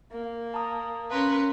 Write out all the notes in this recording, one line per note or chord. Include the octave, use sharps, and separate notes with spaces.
A#3
A5 A#5 D#6
C#4 A#4 B4 F5 A#5 C6